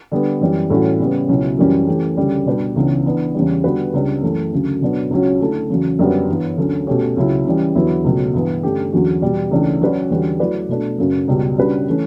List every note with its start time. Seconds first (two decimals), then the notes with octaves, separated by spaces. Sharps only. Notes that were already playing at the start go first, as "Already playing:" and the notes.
0.12 D3 G3 B3
0.41 F#2 E3 G3
0.70 A2 E3 G3 C#4 F#4
1.00 C#3 G3 B3
1.29 C#2 B2 F#3 C#4 E4
1.59 F#2 E3 G3 C#4 F#4
1.88 E3 A3 C#4 G4
2.17 D2 C#3 G3
2.46 B2 G3 D4 G4 B4
2.76 C#2 C#3 E3 B3 D4
3.05 E3 B3 D4
3.34 E2 C#3 G3
3.64 D3 G3 B3 F#4 B4
3.93 C#2 C#3 G3 D4
4.22 F#2 E3 A3
4.52 D2 C#3 F#3
4.81 B2 F#3 B3 D4
5.10 C#2 C#3 F#3 C#4 F#4
5.40 D3 A3 E4 A4
5.70 E2 C#3 F#3
5.99 F#2 D3 G3 B3 F#4
6.28 G2 E3 B3
6.57 D2 D3 F#3 C#4
6.87 B2 A3 C#4 G4 C#5
7.16 C#2 C#3 F#3 C#4 E4
7.45 C#3 E3 G3
7.75 E2 D3 F#3 B3 E4
8.04 C#2 B2 F#3 A3
8.34 G2 E3 B3
8.63 G2 D3 A3 C#4 G4
8.92 E2 D3 F#3 C#4 F#4
9.22 E2 B2 G3
9.51 C#2 C#3 E3 A3 D4
9.81 F#3 C#4 F#4 B4 D5
10.10 E2 D3 G3 C#4 F#4
10.40 F#3 A3 E4 B4 D5
10.69 B2 A3 D4
10.98 F#2 C#3 F#3
11.28 C#2 B2 G3
11.57 C#3 G3 D4 F#4 B4
11.88 E3 A3 C#4